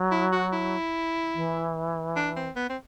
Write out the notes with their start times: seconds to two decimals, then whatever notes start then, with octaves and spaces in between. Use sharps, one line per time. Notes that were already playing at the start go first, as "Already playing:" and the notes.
Already playing: F#3
0.11 E4
0.32 F#4
0.53 E4
1.34 E3
2.16 D4
2.36 C4
2.56 B3
2.69 C4